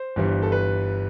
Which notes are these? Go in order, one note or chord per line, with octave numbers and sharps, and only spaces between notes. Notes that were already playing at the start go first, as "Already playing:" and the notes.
Already playing: C5
G1 G2 E3 G3
A4
B4